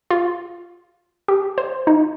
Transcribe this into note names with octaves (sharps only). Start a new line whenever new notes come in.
F4
G4
C5
D#4